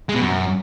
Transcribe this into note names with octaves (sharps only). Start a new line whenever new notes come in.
G#3
B2
F#2